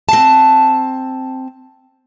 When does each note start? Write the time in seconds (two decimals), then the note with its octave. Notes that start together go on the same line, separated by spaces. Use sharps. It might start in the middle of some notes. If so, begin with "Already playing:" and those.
0.09 C4 A5